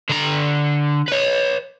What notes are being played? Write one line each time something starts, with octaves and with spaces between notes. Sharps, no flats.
D3 A#5
B4 C#5